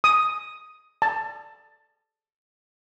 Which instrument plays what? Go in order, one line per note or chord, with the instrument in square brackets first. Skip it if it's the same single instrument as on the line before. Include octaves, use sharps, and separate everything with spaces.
[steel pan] D#6
A5